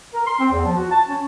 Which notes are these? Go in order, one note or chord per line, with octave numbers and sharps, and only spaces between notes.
A#4
C6
C4
E2
F3
F#4
A5
C#4